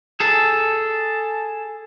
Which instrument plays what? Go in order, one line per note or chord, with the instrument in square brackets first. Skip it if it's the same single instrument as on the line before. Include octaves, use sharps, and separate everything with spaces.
[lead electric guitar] G#4 A4